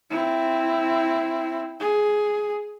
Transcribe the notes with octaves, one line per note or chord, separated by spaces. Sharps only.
C4 E4
G#4